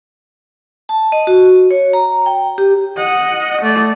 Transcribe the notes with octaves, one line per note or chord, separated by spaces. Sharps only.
A5
D#5
F#4
C#5
A#5
G5
G4
D#5 F#5
A3 D5